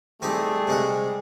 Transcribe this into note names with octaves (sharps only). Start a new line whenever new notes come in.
G3 A3 C4 D#4 G4 G#4
C3 G#3 F#5